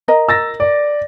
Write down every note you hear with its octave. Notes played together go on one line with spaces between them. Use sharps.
A#4 D#5 A#5
E6 A6 A#6
D5